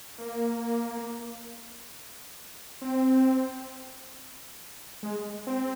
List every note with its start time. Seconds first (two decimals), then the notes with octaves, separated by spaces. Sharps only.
0.18 A#3
2.82 C4
5.03 G#3
5.47 C4